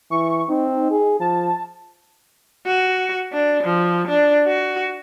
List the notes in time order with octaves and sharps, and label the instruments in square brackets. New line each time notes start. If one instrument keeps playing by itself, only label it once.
[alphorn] E3 [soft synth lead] C#6
[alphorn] C4 [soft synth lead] D#4
[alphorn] G#4
[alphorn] F3 [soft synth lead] A5
[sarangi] F#4
D4
F3
D4
F#4